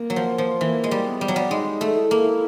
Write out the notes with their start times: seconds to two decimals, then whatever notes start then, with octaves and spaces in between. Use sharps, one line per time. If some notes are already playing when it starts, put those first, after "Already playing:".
Already playing: A#3
0.10 F#3
0.16 F3
0.38 F3
0.61 E3 A#3
0.84 G#3
0.91 G3
1.06 B3
1.21 G3
1.28 F#3
1.36 G3
1.50 G#3 D#4
1.81 A3
1.96 E4
2.11 A#3